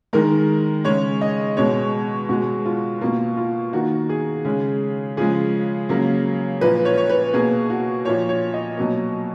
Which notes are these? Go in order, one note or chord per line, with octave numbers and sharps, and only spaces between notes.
D#3 G#3 A#4
C#3 G#3 C#5
D#5
B2 G#3 C#5
B2 G#3 F#4
F4
B2 A#3 F4
F4
D#3 A#3 F#4
G#4
C#3 G#3
C#3 F3 G#3 G#4
C#3 F#3 A#3
A#2 F3 A#3 B4
C#5
C#5
B4
B2 A#3 G#4
F#4
A#2 F3 A#3 C#5
C#5
D#5
B2 F#3 A#3